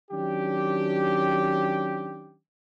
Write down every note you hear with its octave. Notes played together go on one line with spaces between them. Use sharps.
D#3 F#3 C#4 D4 G4